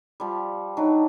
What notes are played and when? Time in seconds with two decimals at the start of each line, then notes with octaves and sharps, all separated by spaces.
0.20 F3 G3
0.77 F#3 D4 D#4